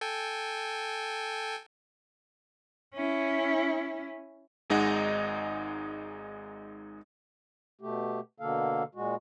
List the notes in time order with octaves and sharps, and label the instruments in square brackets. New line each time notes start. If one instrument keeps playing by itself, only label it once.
[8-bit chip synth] A4 G5 G#5
[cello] C#4 E4
[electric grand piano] G#1 G#3 D#4 D#5 F#5
[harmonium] B2 A3 G4
B2 D3 A#3 A4 F5
A#2 G#3 F#4